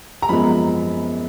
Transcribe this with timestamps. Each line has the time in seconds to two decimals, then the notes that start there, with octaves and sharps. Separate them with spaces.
0.22 A#5
0.29 F#2 F3 G#3 B3 B5